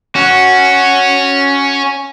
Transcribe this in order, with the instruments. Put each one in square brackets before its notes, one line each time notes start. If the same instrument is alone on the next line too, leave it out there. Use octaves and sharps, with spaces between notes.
[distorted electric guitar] C#4 [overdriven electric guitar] F#4